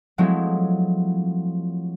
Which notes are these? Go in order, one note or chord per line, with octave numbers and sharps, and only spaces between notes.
F3 F#3 G#3 A3 C4 E4